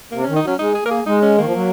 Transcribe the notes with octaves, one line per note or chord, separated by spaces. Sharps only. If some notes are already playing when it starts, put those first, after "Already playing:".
C3 A#3
D#3 C#4
D#4
F#3 C#4
G#3 D#4
G#4
A#3 A#4
G#4
G#3 D#4
C#4
D#3 A#3
F3
F#3